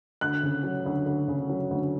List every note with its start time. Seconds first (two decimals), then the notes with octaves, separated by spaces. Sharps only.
0.21 D2 F#6
0.43 C#3
0.63 F#3
0.86 D2
1.06 D2
1.28 C#3
1.49 F#3
1.71 D2